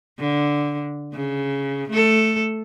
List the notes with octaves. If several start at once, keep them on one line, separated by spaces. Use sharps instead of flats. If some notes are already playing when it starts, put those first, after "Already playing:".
D3
C#3
A3 A4